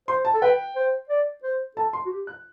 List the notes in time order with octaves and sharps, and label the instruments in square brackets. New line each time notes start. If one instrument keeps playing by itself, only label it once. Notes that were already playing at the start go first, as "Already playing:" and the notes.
[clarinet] C5 [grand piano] C6
[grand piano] A5
[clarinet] A4
[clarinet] B4 [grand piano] G5
[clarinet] C5
D5
C5
[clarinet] A4 [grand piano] A5
[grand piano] C6
[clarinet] F#4
G4
[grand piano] F#6